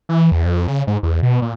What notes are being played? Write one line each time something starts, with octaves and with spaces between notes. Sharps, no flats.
E3
E2
F2
C#3
G#2
E2
B2
A#2